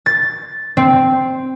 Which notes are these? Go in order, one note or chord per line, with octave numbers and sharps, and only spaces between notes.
A6
C4